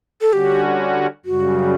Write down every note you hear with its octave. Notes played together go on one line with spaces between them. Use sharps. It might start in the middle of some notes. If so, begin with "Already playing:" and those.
A4
D3 G3 C#4 F#4 G4
F#2 C#3 G3 F#4